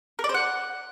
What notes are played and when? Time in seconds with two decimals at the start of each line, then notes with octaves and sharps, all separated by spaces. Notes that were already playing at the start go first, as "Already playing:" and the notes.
0.19 A#4
0.24 D5
0.29 C5
0.34 F#5